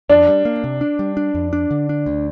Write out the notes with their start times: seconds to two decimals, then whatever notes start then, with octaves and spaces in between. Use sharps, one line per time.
0.09 F2 D4
0.27 G3
0.45 A#3
0.64 C3
0.81 D4
0.99 G3
1.17 D4
1.35 F2
1.53 D4
1.71 D3
1.89 D4
2.06 D2